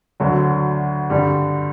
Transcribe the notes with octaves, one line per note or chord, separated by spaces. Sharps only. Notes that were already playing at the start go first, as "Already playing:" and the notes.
D2 D3 F#3
G2 D3 G3